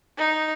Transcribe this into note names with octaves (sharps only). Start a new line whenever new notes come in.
D#4